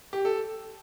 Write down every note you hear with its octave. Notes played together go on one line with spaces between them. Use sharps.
G4
A4